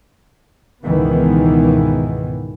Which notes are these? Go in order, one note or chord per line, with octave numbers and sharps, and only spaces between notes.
C#2 G#2 B2 D#3 E3 B3